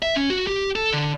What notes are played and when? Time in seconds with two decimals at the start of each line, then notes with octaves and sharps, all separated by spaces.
0.02 E5
0.16 C#4
0.30 F#4
0.47 G4
0.76 A4
0.93 D3